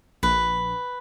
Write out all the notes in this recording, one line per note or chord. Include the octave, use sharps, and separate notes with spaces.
A#1 B4